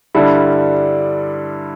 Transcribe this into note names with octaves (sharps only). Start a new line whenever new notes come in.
G2 D3 G3 E4